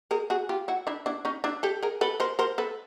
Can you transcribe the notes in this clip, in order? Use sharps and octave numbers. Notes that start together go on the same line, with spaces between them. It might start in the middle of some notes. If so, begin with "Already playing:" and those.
G#4 A#4
F#4 G#4
F4 G4
E4 F#4
D4 E4
D4 E4
C#4 D#4
D4 E4
G4 A4
G#4 A#4
A4 B4
A#4 C5
A#4 C5
A4 B4